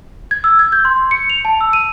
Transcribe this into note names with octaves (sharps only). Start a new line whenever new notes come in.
G#6
E6
G#6
G6
C6
C#7
F7
A5
E6
D#7